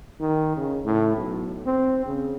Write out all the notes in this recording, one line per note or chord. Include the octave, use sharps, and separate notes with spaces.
D#3
C#3
A2
B1
C4
C#3